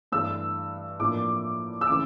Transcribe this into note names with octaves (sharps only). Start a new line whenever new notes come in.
G2 E3 A3 E6
A2 F3 A#3 D4 D6
E6
C#3 E3 A3 D6